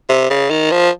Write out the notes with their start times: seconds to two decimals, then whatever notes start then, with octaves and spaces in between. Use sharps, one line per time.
0.09 C3
0.30 C#3
0.50 D#3
0.71 F3